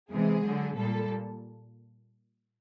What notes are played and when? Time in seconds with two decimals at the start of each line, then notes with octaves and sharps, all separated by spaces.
0.11 C3 E3 G#3 G#4
0.43 D3 F#3
0.76 A#2 G3 A4